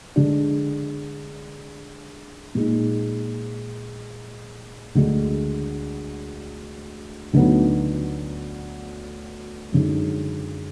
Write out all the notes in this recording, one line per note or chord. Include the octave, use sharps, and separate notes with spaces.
D3 G#3 D4
A#2 G#3 D#4
D2 D3 G#3 D4
D2 D3 F#3 B3 D#4
F#2 D3 G#3 D#4